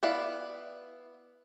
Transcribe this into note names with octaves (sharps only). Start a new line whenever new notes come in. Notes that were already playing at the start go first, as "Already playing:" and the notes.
B3 E4 B4 D5 F5